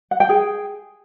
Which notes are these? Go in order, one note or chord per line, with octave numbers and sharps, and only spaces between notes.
F#5
G5
G#4